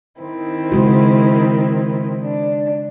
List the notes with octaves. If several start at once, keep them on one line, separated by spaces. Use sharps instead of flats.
D#3 C4 E4
C#3 G#3 F#4
D4